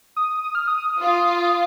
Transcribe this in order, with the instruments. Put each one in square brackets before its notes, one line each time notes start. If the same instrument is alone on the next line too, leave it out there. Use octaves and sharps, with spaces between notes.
[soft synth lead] D#6
D#6
F6
D#6
[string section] F4